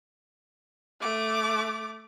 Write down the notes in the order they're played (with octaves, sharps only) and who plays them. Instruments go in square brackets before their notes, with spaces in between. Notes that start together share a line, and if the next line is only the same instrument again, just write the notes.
[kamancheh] A3 D6